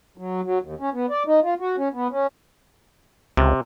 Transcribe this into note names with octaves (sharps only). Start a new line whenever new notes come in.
F#3
F#3
D#2
C#4
B3
D5
D#4
F4
F#4
C#4
B3
C#4
C#2 C3